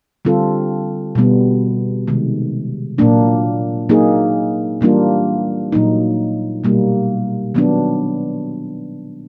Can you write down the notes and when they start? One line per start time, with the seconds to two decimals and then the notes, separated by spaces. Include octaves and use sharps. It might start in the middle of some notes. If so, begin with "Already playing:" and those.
0.25 D3 G3 C4 F4 A4
1.15 B2 G3 B3
2.08 C3 D#3 G#3
2.98 A#2 F#3 A#3 D4
3.89 F#3 A#3 D#4 G#4
4.81 E3 G3 A#3 D4 F4
5.72 A#2 F#3 A#3 D#4
6.64 B2 G3 A#3
7.55 D#3 F#3 B3 D4